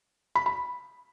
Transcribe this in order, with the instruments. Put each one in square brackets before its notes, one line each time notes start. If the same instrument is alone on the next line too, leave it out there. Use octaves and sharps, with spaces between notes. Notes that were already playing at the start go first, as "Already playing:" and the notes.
[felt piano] B5
B5